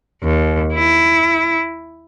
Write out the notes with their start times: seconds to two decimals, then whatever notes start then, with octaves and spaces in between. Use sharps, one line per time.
0.23 D#2
0.73 E4